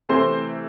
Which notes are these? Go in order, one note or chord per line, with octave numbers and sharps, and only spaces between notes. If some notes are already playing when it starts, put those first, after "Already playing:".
C3 E3 A3 C4 C5 C6